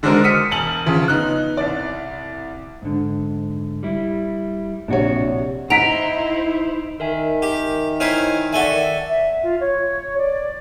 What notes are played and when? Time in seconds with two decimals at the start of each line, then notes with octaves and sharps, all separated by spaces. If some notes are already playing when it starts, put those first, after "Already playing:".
0.03 D3 G#3 D4 F#4 A#4 C5
0.24 D#6 F6 B6 C#7 D#7
0.51 E1 G#5 A5 F#7
0.86 D2 C#3 F3
1.08 B3 D#4 F#6
1.57 C2 D5
2.82 G#2 D3
3.83 G3 E4
4.88 A#1 C3 D4 F#4 C#5
5.70 D#4 E4 C5 F#5 A#5 B6 D7 F7
7.00 D#3 A#4 E5 G#5
7.42 G4
8.00 D#4 E4 C5 C#5 G#5 F6
8.53 F#4 A4 D5 E5 G#5
9.09 E5
9.43 F4
9.61 C#5
10.18 D5